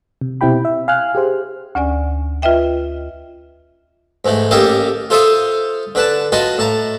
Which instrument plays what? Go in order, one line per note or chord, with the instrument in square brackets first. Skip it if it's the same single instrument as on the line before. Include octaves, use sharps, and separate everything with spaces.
[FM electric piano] C3
B2 C4 E4 G4 G5 B5
E5
F5 G#5 F6 F#6
G4 G#4 C5
[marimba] D2 C#4 D5 G#5
F4 B4 D#5 E5 G5
[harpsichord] G#2 E3 A3
A1 A#3 G4 A4 D#5 F5
F4 A4 C5 E5 F5 D#6
D3 B4 A5
F4 F#4 B4 D#5 A5
A2 A5 A#5